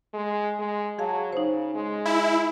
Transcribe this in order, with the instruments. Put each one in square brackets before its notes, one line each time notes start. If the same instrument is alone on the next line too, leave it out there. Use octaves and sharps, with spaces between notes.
[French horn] G#3
G#3
[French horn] F#3 [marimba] G#4 F5 A5
[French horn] C#3 [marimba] D#4 C5
[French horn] G#3
[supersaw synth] E4